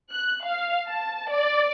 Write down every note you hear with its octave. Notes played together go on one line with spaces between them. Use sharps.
F#6
F5
A5
D5